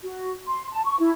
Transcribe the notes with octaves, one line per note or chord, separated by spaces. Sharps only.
F#4
C6
A5
C#6
E4